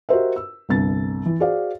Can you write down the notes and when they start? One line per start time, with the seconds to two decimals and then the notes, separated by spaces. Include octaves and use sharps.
0.09 F#4 G4 A#4 C5 D#5 E5
0.36 E6
0.69 G1 C2 A6
1.26 E3
1.40 F#4 G#4 C5 D5 F5